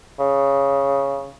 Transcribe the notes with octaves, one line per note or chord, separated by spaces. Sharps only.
C#3